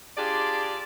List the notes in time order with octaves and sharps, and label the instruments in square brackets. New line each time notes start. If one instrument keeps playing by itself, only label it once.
[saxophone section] D4 F4 G4 G#4 D5